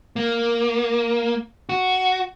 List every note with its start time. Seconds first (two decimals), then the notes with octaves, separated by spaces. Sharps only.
0.16 A#3
1.69 F#4